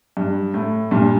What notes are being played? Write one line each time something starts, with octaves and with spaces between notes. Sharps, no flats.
G2
A2
G2 A#2